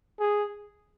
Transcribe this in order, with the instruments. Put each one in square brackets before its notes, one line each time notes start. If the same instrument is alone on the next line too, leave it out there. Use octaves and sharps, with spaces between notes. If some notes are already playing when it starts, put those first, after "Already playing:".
[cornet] G#4